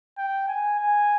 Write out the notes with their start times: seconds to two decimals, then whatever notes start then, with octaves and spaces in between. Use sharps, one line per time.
0.18 G5
0.49 G#5
0.79 G#5